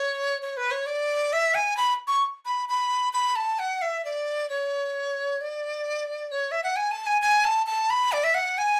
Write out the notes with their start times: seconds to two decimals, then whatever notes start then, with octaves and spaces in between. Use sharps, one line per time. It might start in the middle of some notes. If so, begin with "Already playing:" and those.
Already playing: C#5
0.42 C#5
0.57 B4
0.71 C#5
0.86 D5
1.33 E5
1.55 G#5
1.77 B5
2.08 C#6
2.45 B5
2.69 B5
3.13 B5
3.36 A5
3.59 F#5
3.82 E5
4.05 D5
4.50 C#5
5.41 D5
6.32 C#5
6.52 E5
6.64 F#5
6.76 G#5
6.91 A5
7.06 G#5
7.22 G#5
7.45 A5
7.66 A5
7.90 B5
8.12 D5
8.24 E5
8.34 F#5
8.58 G#5